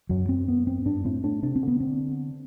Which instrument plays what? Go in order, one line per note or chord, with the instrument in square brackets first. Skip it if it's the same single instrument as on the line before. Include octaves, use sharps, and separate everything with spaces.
[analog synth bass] F#2 [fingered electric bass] F#3
[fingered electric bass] C4
B3
C4
[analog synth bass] G2 [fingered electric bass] D4
[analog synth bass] A2 [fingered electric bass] C4
[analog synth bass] A2 [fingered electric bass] D4
[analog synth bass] C3 [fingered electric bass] D4
[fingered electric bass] C4
[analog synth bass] D3 [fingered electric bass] B3
[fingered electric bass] C4